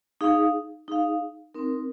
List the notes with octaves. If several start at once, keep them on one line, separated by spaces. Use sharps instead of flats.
D#4 G#4 F5
D#4 G#4 F5
C4 D#4 A#4